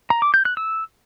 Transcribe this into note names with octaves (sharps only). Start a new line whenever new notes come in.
A#5
D6
G6
F#6
E6